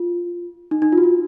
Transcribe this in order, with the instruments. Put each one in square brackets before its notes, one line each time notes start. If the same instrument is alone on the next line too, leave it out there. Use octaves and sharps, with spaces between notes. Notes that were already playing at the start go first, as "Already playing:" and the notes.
Already playing: [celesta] F4
D#4
D#4
F4
F#4
F4